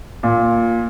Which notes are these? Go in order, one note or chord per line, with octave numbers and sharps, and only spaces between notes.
A#2